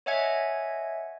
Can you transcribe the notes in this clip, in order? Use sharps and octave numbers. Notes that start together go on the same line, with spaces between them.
C#5 D#5 E5 F#5 G#5 G#6